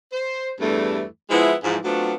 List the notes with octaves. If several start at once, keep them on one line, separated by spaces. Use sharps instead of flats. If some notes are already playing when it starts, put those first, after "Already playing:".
C5
E2 G2 E3 G3 A3
F3 G#3 B3 E4
G#2 E3 F3
F#3 A3 B3 C4 D4 F4